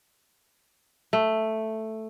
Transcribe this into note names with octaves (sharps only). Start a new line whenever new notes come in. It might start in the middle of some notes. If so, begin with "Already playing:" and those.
A3